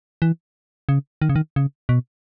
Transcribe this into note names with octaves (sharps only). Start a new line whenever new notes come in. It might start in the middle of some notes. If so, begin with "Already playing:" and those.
E3
C#3
D#3
C#3
D#3
C#3
B2